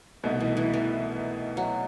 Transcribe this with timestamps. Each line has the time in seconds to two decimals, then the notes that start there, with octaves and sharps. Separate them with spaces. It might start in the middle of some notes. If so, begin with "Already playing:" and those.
0.24 C2 B2 A3 D#4
0.40 E3
0.57 E3
0.74 E3
1.57 F#3